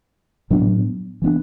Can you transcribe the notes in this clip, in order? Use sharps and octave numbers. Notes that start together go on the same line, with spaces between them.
A2 F#3 B3 D4
E3 B3 D4